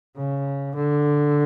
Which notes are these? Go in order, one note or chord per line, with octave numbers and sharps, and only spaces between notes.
C#3
D3